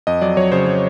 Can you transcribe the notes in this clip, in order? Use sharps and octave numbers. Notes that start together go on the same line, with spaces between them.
F2 D#5
F#3 D5
F#3 C#5
C#3 C5
F#3